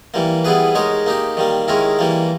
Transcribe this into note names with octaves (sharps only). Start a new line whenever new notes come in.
E3 G3 A#3
G3 B3 E4 G#4 B4
G#3 D#4 A#4 C#5
A#3 D#4 G4
D#3 G3 A#3
D#3 G#3 C#4 E4 A#4
E3 G3 A#3